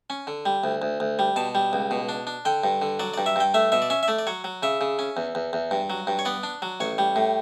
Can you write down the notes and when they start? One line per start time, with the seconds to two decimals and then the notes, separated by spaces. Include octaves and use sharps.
0.10 C#4
0.27 D3
0.46 G3
0.64 D2
0.82 D2
1.00 D2
1.19 G3
1.36 B2 A5
1.55 G3
1.73 C#2
1.91 B2
2.09 D4
2.27 D4
2.45 D3 G5
2.64 G2
2.82 D3
3.00 F#3 D5
3.14 G2 D5
3.26 E5
3.36 G2 G5
3.54 A3 E5
3.72 B2 E5
3.82 D5
3.90 C#4 E5
4.03 E5
4.08 A3 D5
4.19 D5
4.27 F#3 C#5
4.44 F#3
4.63 C#3 E5
4.81 C#3
4.99 C#4
5.17 E2
5.35 E2
5.53 E2
5.71 G2
5.90 F#3
6.07 G2
6.19 C#5
6.25 B3 D5
6.43 D4
6.62 F#3
6.80 A1 C#5
6.98 G3
7.16 A2